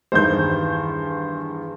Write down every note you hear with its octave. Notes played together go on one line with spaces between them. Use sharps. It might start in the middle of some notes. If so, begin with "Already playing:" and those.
E2 G2 D#3 C5 G6